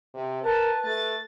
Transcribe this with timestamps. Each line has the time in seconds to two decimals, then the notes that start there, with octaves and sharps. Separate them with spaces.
0.14 C3
0.43 A#4 B4 A5
0.84 A3 A6